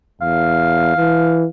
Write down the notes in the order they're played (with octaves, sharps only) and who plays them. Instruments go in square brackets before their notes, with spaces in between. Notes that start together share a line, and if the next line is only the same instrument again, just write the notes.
[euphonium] E2 [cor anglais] F5
[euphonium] E3